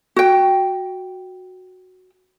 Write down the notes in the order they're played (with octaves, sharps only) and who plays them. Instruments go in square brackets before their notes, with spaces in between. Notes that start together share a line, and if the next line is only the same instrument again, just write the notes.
[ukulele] F#4 G5